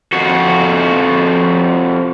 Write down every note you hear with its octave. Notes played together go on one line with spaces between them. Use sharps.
F2 F#4